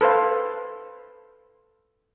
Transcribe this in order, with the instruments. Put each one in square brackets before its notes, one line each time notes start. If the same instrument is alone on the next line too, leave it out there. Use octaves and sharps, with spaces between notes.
[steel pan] A4 B4 C5 F5